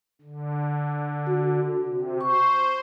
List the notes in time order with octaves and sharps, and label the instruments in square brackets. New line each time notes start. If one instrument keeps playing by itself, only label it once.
[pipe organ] D3
[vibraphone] F#4
[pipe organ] C3
[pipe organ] C5 [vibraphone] C#6